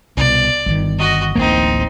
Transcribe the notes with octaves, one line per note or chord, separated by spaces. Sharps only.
C2 B2 D5
G1 D#3
F#4 D#5
D1 A1 A#3 C4 D#4